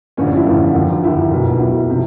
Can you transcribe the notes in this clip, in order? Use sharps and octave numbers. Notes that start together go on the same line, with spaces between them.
A1 G2 D3 F3 C#4
D4
E4
A1 G2 D3 F3 F4
D#2 D3 F3
D#2 D3 F3 E4
B1 B2
B1 B2 E4
C3 F3